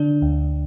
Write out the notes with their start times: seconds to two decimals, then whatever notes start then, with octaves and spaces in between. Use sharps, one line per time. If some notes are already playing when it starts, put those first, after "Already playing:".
Already playing: D3 D4
0.22 D2